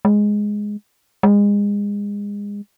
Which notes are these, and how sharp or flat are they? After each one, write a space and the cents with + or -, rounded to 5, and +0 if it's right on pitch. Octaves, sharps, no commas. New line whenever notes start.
G#3 +0
G#3 -30